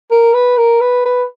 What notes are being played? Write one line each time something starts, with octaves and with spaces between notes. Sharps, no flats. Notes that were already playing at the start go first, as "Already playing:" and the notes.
A#4
B4
A#4
B4
B4